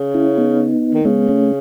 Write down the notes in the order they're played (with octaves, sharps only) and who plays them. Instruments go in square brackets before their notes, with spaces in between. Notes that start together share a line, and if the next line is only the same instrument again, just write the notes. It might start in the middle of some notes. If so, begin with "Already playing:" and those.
Already playing: [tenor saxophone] C#3
[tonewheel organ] C#4 E4
B3 D#4
[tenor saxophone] D#3
[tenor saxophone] C#3 [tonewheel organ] G#3 B3
[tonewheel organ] A3 C#4